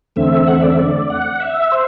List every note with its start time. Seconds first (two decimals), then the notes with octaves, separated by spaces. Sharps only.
0.16 E2 D3 A3 C4 E5
0.47 F#5
0.56 E5
0.62 D5
0.70 E5
0.79 D5
1.10 F#5
1.40 E5
1.72 C5